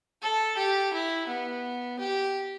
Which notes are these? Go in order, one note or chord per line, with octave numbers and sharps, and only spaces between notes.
A4
G4
E4
B3
G4